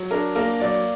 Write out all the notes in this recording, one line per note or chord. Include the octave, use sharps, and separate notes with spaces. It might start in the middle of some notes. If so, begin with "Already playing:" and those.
Already playing: F#3
D4 A#4
A#3 A#4
F#3 D5